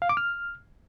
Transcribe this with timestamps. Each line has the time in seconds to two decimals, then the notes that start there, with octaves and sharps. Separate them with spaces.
0.02 F5
0.09 D6
0.17 F6